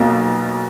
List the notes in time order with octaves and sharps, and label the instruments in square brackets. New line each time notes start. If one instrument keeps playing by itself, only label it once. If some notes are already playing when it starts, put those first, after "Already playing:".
Already playing: [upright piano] B1 B2 A#3